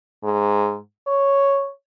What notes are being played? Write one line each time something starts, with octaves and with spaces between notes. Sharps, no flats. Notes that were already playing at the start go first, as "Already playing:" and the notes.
G#2
C#5